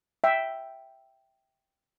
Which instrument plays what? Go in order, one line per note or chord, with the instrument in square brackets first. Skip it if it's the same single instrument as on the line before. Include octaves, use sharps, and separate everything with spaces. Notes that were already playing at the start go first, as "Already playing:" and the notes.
[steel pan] E5 G5